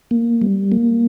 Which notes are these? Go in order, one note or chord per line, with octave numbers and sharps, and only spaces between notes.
A#3
G3
A#3